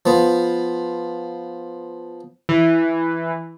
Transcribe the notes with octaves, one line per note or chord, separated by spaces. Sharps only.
F3 B3
E3